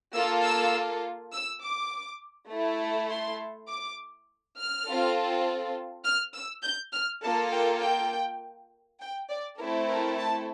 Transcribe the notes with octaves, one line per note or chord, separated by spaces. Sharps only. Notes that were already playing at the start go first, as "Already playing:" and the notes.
A#3 F4 A4 E6
E6
E6
D6
A3 E4 A4
C6
D6
F6
C4 F4 A4
F6
E6
G6
F6
A#3 F4 A4 A5
G5
G5
G5
D5
A3 C4 E4 A4 A#4
A#4
A5